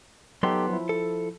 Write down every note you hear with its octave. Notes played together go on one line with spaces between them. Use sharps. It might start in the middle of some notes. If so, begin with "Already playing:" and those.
F#3 B3 D#4 G4 A4 C6
F3 E4
A4